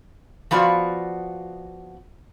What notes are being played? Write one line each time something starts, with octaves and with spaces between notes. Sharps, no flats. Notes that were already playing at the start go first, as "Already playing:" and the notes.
F3 B3 F4 F#4 D5